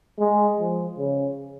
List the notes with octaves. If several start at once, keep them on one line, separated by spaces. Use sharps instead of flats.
G#3
F3
C#3